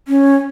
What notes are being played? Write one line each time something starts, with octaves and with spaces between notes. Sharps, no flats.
C#4